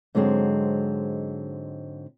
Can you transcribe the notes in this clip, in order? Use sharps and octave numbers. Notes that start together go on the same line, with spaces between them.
G#2 D3 F#3 G#3 C4